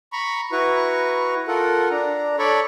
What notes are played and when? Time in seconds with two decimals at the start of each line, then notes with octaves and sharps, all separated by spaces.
0.13 A#5 B5 C#6
0.52 E4 F#4 B4 A#5 C#6
1.48 F4 A4 A#4 F#5
1.91 D4 A#5
2.39 A4 C#5 D5 B5 C#6